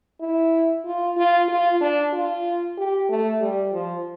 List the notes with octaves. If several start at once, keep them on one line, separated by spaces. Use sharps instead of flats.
E4
F4
F4
F4
D4
F4
G4
A3
G3
F3